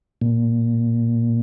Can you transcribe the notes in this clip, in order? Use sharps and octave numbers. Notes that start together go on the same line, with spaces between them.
A#2